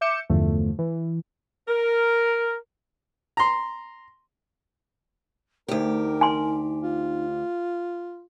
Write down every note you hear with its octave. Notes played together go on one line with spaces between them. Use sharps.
E5 D6 G6 C#7 E7
E2 G2 D3 F3 A3
E3
A#4
A#5 C6
D2 D#4 G4 A#4
G#5 C6
F4